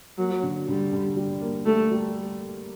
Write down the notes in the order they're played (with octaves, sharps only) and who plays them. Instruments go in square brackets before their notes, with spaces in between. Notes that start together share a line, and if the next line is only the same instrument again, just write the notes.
[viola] F#3 [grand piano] A#3
[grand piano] D3
[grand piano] D3 [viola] G3
[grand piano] D3
G3
A#3
[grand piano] G3 [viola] A3
[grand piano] G3